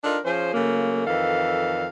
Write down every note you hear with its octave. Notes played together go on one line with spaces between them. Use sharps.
D4 D#4 F4 A4 A#4
F3 C#4 G#4 C5
C#3 F#3 A3 A#3
F2 D#3 E3 A4 F5